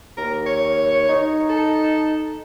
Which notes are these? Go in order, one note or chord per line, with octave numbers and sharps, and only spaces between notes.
D#2 A#4
C#5
D#4
A4